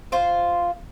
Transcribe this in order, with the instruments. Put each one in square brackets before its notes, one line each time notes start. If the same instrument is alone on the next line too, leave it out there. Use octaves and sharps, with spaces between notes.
[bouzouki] F4 C5